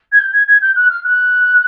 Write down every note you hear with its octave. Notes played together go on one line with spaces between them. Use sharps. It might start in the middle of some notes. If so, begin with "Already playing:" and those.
G#6
G6
G#6
G#6
G6
F#6
F6
F#6